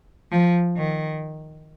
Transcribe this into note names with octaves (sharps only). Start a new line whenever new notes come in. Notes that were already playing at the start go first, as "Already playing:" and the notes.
F3
D#3